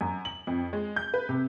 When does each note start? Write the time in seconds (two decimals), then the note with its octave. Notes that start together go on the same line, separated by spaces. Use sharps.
0.01 F#2
0.25 F#7
0.47 F2
0.73 G#3
0.96 G6
1.14 B4
1.29 C3